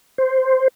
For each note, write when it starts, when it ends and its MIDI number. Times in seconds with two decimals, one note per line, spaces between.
0.18 0.68 72